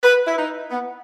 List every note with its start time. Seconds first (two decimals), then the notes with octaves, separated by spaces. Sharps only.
0.03 B4
0.26 E4
0.37 D#4
0.71 B3